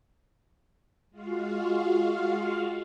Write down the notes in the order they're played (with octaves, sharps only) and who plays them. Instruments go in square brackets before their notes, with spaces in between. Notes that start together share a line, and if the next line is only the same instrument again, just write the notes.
[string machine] G#3 F4 F#4 F5